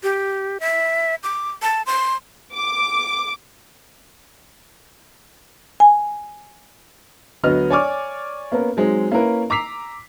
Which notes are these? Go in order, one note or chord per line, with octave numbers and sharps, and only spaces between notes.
G4
E5
D6
A5
C6
D6
G#5
D2 F#3 B3 F#4 D#5 F6
C#5 D5 G#5 C#6 D6 F6
A#3 B3 C#4 A#4
F#3 G#3 C4 D#4
A#3 C#4 E4 A#4 B4
A#5 D6 E6 B6 C7 F7